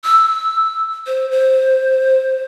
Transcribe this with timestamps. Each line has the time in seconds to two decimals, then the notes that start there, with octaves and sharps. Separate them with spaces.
0.04 E6
1.07 C5
1.31 C5